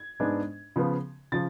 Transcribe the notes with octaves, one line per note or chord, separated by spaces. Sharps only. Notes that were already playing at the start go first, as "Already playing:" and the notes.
Already playing: G#6
G#2 G#3 B3 D4
C#3 F3 B3
C#3 F3 A6